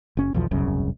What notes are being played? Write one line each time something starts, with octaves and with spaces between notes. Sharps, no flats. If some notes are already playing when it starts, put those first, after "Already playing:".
F#1 C#4
B1 E2 F3
E1 C2 F#2 C#3